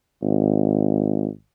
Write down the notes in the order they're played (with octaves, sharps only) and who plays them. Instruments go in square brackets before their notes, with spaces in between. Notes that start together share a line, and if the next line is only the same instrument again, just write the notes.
[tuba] G#1